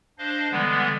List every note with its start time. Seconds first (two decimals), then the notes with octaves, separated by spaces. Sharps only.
0.18 D4 C5 D#5 F5
0.52 D3 E3 G3 G#3 B3